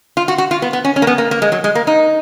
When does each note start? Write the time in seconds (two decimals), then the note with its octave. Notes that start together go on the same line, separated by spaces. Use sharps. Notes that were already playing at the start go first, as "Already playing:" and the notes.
0.17 F4
0.28 F#4
0.38 F#4
0.51 F4
0.62 B3
0.73 B3
0.85 C#4
0.96 C#4
1.02 A#3
1.07 B3
1.18 A#3
1.31 A#3
1.42 G#3
1.52 F#3
1.64 G#3
1.75 A#3
1.87 D#4